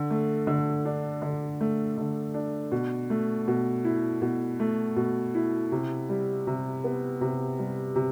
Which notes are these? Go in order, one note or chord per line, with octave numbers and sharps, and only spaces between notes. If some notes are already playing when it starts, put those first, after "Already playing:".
Already playing: D3
A3
D3
D4
D3
A3
D3
D4
B2
A3
B2
E4
B2
A3
B2
E4
C3
G3
C3
B3
C3
G3
C3